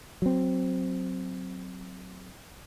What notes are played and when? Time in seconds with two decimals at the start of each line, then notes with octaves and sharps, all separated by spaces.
0.22 F#3 C4